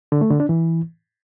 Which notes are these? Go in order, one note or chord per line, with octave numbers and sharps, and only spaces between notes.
D3
A3
D3
D4
E3